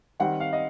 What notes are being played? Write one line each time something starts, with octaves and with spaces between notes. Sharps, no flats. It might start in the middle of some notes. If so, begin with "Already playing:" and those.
D#3 G3 C4 F#5
F5
D#5